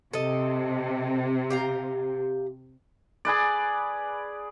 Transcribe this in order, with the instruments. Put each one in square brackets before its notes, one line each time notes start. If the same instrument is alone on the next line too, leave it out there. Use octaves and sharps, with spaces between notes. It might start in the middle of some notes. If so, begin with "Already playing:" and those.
[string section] C3 [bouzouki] A4 D#5
[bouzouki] G4 F5 A#5
[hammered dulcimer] G#4 B4 D5